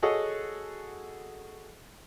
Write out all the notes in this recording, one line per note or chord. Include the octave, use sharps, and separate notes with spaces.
F#4 G#4 A4 C#5 D#5 F#5